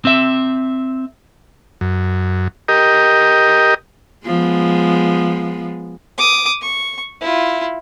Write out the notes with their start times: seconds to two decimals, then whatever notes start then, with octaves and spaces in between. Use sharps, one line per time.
0.05 C4 E5
1.81 F#2
2.68 G4 A#4 D#5
4.26 F3 G#3 B3
6.18 D6 D#6
6.62 C#6
7.21 E4 F4